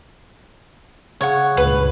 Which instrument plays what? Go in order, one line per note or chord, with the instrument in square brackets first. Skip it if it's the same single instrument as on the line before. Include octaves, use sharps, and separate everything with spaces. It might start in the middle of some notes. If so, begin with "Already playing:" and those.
[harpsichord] C#3 [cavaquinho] C#5 F#5
[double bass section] C#2 G2 A#2 [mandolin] B4